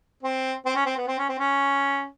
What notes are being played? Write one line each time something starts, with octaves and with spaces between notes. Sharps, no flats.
C4
C4
C#4
C4
B3
C4
C#4
C4
C#4